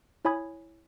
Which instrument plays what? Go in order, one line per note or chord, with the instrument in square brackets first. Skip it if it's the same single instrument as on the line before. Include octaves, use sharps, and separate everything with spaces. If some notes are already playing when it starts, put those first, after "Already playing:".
[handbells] E4 C#5 G#5 B5 D#6 G#6